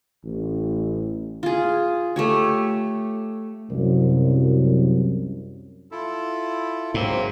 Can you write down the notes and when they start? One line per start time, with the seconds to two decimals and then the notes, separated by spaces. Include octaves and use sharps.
0.24 A1
1.43 F4 G#4
2.16 A3 G4 C#5
3.70 C2 F#2
5.91 E4 F4 A4
6.94 G#2 F#3 A#3 C4